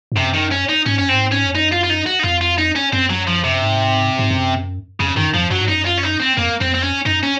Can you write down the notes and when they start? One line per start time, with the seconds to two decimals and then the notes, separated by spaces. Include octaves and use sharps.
0.12 G#2
0.17 F#2 C3
0.34 D#3
0.52 C#4
0.69 D#4
0.86 G#2 C#4
0.98 F#2 C#4
1.09 C4
1.14 G#2
1.32 C#4
1.46 F2
1.55 F#2 D#4
1.72 F4
1.84 F4
1.90 D#4
2.06 F#4
2.19 D#4
2.24 F2 F4
2.41 F4
2.58 D#4
2.75 C#4
2.93 F#2 C4
3.09 F#3
3.27 F3
3.41 F2 C3
3.51 F#2
3.62 G#2
4.19 G#2
4.31 F#2
5.00 F2 C#3
5.17 F#2 D#3
5.34 F2 F3
5.50 F#2 F#3
5.61 G#2
5.68 F#2 D#4
5.85 F4
5.97 C#4
6.03 D#4
6.20 C4
6.37 F2 A#3
6.61 F2 C4
6.74 C4
6.83 C#4
7.06 F#2 D#4
7.23 C#4